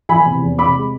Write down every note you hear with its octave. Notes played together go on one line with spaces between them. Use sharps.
E3 G#5 B5
C3
E2
C3 B5 D6
G#3